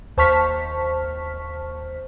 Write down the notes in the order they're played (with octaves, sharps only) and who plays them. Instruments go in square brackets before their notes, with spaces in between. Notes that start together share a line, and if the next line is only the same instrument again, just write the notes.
[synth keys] D#2 C5 A5 C#6 F6 B6